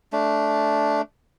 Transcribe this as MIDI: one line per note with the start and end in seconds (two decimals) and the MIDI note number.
0.13 1.02 57
0.13 1.02 62